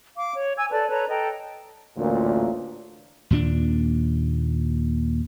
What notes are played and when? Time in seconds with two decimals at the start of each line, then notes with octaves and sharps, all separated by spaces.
0.16 F5 D6
0.34 C#5
0.56 G#5 E6 G#6
0.71 A4 B4 D5 A5
0.89 A4 B4 C#5 A#5
1.08 A4 D#5 G5 A#5
1.97 A1 D2 A#2
3.30 D#2 A#2 A#3 D4